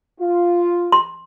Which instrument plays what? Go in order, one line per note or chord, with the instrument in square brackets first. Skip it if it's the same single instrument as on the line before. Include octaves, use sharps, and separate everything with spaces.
[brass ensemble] F4
[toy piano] C6